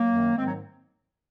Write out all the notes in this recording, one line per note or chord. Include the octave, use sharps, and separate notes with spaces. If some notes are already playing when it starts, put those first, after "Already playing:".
Already playing: F#3 A#3
F#2 D#3
G#2 D#3 G#3 C4
F#3